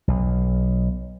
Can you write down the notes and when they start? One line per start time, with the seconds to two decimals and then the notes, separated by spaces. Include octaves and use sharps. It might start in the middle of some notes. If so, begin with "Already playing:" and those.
0.08 B1